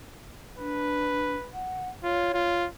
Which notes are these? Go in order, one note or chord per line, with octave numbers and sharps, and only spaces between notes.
D4 B4
F#5
F4 C#5
F4